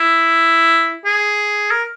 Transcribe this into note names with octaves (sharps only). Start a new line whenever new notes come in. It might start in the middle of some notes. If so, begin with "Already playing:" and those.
Already playing: E4
G#4
A#4